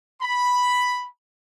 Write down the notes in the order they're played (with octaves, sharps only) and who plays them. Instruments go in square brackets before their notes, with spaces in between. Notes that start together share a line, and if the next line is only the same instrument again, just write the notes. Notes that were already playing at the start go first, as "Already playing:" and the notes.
[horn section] B5